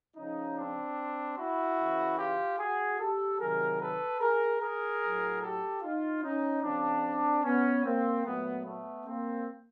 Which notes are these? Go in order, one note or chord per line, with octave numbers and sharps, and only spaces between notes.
C#3 F3 C#4 D#4
C4 D4
E4 F#4
C#3 E3
F4 G4
F#4 G#4
G4 A4
C3 D#3 F#3 G#4 A#4
A4 B4
G#4 A#4
G#4 A#4
A2 F#3
G4 A4
D#4 F4
C#4 D#4
C#3 F3 C4 D4
B3 C#4
A#3 C4
A#2 F#3 A3 B3
A3 B3
A#3 C4